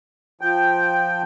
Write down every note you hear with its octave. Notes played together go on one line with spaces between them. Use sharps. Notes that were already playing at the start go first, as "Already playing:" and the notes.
F3 G5